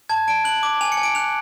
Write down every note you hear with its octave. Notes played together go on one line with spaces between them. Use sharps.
A5 G#6
A5 D7
F#6 F#7
D6
G#5 F7
C#7
G#5
D7
F#6 F7